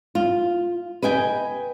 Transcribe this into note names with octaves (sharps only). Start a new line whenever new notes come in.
F4
B4 D#5 G5 G#5